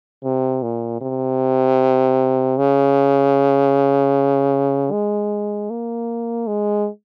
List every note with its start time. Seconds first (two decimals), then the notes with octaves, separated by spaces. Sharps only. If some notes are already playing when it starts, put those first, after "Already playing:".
0.24 C3
0.63 A#2
1.01 C3
2.58 C#3
4.92 G#3
5.70 A#3
6.47 G#3